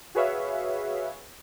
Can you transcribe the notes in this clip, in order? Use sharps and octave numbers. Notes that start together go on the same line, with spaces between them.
F#4 G#4 B4 C#5 E5 F5